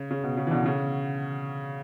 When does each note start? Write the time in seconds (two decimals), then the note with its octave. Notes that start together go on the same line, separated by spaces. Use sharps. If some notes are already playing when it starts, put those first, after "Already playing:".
Already playing: C#3
0.11 C#3
0.24 B2
0.37 C#3
0.47 E3
0.51 B2 D3
0.66 C#3